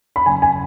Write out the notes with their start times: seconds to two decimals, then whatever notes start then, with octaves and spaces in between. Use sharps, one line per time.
0.16 B5
0.26 F#1 G#5
0.42 G#5